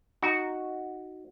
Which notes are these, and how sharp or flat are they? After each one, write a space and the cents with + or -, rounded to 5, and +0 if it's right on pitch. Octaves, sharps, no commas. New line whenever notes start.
D#4 +0 F#4 +0